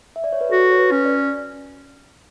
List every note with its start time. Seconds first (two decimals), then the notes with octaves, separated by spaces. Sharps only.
0.16 E5
0.24 D5
0.33 C#5
0.41 B4
0.50 F#4 A4
0.72 C#5
0.78 B4
0.91 C#4
1.05 D5